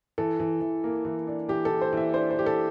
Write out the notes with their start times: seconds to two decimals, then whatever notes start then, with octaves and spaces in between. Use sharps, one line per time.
0.18 E3 A4
0.40 E3
0.61 E3
0.84 A#3
1.05 E3
1.27 D4
1.49 E3 G4
1.65 A4
1.71 E3
1.81 C5
1.93 E3 E5
2.14 D4 C5
2.31 C5
2.36 D4 G4
2.46 A4